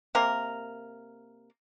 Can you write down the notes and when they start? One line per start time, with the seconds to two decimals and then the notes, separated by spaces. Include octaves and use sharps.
0.15 C3 A#3 A#4